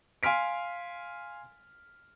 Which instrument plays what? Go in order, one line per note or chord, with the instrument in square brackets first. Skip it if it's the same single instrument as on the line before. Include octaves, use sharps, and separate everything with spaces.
[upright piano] F5 G#5 C6 F6 B6 D7